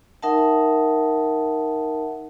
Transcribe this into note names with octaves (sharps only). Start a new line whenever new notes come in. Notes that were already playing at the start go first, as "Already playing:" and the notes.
D#4 A#4 E5 F#5 A5